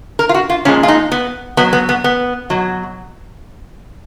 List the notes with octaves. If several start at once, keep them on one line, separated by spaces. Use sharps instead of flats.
A#4
F4
F#4
F4
A#2 F3 G#3 C#4
F4
D#4
B3
B2 F#3 B3
B3
B3
B3
B2 F#3